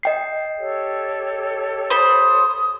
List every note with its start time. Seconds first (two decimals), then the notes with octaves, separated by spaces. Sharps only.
0.03 D#5 G5 C7
0.58 G4 A4 C#5
1.90 C5 B5 D#6